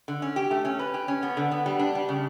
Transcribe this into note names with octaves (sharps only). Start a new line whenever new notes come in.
D3
C#4
G4
A3
C#4
B4
G4
C#4
B3
D3
B3
G3
D4
G3
C#3